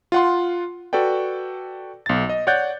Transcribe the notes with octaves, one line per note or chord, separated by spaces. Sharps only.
F4 F#5 C6
F#4 A4 B4 D5 G5
B1 A6
D#5
C#5 D5 F#5 F#6 G6 A6